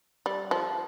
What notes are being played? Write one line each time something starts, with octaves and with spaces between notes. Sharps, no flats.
G3
F3